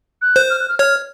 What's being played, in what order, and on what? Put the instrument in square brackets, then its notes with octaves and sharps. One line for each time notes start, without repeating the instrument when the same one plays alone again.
[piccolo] F#6
[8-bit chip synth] C5
[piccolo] F6
F#6
F6
[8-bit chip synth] C#5 [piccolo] F6